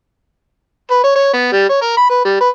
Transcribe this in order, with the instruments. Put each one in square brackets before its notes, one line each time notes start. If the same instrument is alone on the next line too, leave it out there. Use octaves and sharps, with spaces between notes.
[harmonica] B4
C#5
C#5
B3
G3
C#5
A#4
B5
B4
G3
B4